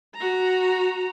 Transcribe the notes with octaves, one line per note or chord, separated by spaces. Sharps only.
F#4 A#5